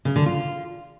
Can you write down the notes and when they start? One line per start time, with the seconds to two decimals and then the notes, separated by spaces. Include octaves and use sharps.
0.05 C#3
0.16 D3
0.26 F4